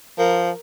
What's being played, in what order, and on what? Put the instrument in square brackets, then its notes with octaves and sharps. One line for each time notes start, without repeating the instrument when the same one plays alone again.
[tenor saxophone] F3 [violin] A#4